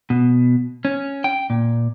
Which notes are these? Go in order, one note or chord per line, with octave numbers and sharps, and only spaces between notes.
B2
C#4
G5
A#2